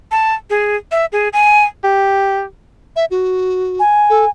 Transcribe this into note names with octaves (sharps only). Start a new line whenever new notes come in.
A5
G#4
E5
G#4
G#5
G4
E5
F#4
G#5
A4